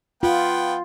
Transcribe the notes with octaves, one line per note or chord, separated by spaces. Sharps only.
B3 F4 G5